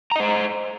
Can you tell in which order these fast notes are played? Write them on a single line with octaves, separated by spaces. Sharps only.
A#5 D#5 C5